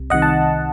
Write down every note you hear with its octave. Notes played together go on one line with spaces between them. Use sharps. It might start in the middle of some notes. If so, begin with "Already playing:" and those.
Already playing: C2 C3
C2 C3 D#3 D#5 F#5
A5